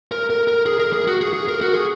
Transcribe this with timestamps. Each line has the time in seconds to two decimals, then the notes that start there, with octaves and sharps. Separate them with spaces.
0.12 A#4
0.30 A#4
0.48 A#4
0.66 G#4
0.79 A#4
0.93 G#4
1.07 F#4
1.21 G#4
1.33 G#4
1.48 A#4
1.61 F#4
1.74 G#4